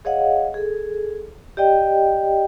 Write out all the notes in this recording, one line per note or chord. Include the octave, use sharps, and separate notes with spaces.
G#4 C#5 D#5 F5 F#5
G#4 A4
G4 D5 D#5 G5